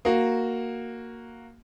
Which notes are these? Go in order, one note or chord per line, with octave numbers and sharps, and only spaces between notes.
A#3 F#4